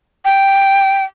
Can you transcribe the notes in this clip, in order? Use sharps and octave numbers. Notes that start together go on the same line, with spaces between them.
G5